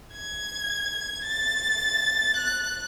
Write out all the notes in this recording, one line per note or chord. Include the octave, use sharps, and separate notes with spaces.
G#6
A6
F#6